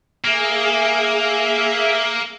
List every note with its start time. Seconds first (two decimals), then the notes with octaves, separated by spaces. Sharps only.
0.24 A#3 G#4 E5